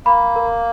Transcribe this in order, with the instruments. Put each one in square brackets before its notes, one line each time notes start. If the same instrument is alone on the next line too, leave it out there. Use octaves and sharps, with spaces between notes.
[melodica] A#3 [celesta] B5
[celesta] A#4